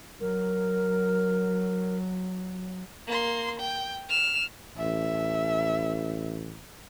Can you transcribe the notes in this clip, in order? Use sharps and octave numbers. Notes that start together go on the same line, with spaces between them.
F#3 A#4
A#3 C6
G5
F6 E7
A1 E5